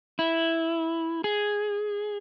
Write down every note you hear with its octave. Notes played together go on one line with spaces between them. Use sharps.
E4
G#4